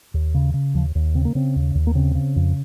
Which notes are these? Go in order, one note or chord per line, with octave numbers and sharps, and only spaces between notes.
D#2
C#3
C#3
D#2 F3
D#2
C#3 C4
A#3
C#3 C4
D#2
D#2
A#3
C#3 C4
C#3
F2